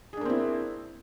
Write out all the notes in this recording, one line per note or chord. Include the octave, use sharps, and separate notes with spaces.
A#3 C4 D4 E4 G#4